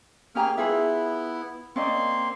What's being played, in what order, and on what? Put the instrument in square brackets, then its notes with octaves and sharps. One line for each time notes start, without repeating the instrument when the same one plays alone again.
[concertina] A#3 G#4 F6 [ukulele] C#4 G4 A#5
[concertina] B3 E4 [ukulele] F4 G#4 E5
[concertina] A#3 C4 C6 [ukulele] C#4 D5 D#5